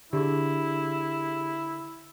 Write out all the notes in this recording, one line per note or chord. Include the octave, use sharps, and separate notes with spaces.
D3 E4 G4 G#4